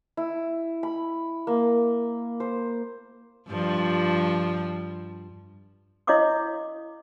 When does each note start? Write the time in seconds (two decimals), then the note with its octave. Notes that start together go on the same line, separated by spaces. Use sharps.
0.17 E4
0.83 B5
1.47 A#3
2.40 C5
3.50 G2 F3 G3
6.07 E4 C#5 D#5 F5 D6 D#6